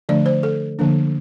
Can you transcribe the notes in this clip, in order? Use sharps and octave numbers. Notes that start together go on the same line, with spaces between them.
D3 F3 A3 D4 D5
C5
A4
D3 F3 A#3 D4